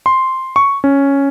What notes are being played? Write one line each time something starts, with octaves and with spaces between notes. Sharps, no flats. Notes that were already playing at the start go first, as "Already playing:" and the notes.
C6
C#6
C#4